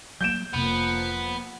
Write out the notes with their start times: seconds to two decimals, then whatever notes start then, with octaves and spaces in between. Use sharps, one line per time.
0.21 F#3 A#3 G6 D7 E7
0.54 F1 C3 F3 A#3 B3 F7